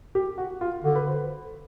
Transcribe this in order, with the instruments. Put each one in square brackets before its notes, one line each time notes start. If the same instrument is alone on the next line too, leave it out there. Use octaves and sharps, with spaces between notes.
[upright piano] G4
F#4
F4
[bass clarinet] D3 [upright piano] F#4
[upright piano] B4
C5